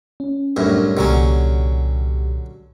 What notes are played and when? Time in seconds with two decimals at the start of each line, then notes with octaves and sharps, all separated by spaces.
0.20 C#4
0.56 C2 F#2 A2 D4
0.97 C2 A#2 D3 F#3 C#4 G4